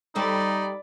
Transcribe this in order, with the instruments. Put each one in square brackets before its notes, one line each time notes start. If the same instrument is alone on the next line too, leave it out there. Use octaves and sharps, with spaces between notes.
[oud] G3 A4 C5 [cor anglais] D#4 [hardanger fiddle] D5 B5